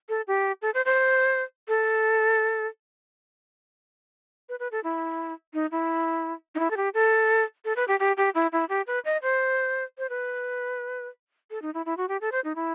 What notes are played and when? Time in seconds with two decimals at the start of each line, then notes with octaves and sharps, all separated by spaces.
0.09 A4
0.27 G4
0.62 A4
0.74 C5
0.85 C5
1.68 A4
4.49 B4
4.60 B4
4.72 A4
4.84 E4
5.54 D#4
5.71 E4
6.55 D#4
6.59 E4
6.71 A4
6.77 G4
6.94 A4
7.65 A4
7.76 B4
7.88 G4
8.00 G4
8.17 G4
8.35 E4
8.52 E4
8.69 G4
8.87 B4
9.05 D#5
9.22 C5
9.98 C5
10.10 B4
11.50 A4
11.62 D#4
11.74 E4
11.86 E4
11.97 F#4
12.09 G4
12.21 A4
12.32 C5
12.44 D#4
12.56 E4